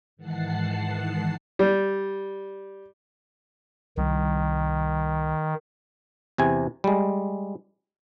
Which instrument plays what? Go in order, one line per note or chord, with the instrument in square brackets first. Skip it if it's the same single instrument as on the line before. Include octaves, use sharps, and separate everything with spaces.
[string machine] G#2 D#3 E3 F#5 A5 C7
[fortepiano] G3
[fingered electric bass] C2 G3 [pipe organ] D#3
[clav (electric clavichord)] E2 C3 G#5
G3 G#3